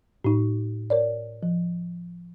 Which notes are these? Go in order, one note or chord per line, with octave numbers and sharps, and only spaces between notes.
A2 D#4
A#4 C#5 D5
F3